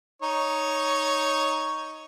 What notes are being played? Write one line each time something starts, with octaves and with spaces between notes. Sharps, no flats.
D#4 C#5